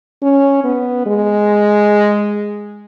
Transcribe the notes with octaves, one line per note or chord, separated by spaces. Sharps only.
C#4
B3
G#3